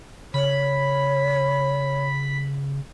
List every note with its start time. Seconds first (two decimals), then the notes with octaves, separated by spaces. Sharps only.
0.34 C#3 C#5 B5